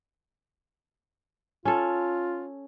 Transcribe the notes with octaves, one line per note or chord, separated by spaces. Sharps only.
C#4 F4 A4